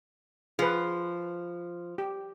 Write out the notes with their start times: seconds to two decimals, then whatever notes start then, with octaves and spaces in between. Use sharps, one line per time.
0.59 F3 G#4 B4
1.98 G4